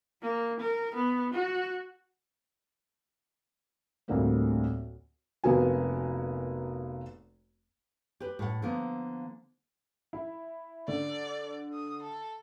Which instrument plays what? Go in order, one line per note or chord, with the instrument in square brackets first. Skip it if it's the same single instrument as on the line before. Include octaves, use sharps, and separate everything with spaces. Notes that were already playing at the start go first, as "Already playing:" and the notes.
[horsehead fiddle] A#3
A#4
B3
F#4
[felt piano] D2 A2 D3 G3 A#3 C4
F1 A#3 B3 F#4 G#5
[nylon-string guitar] G4 B4
A2 F#5
D3 F3 A#3 B3
[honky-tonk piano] E4
[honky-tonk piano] D3 [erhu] D5
[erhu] D#6
A4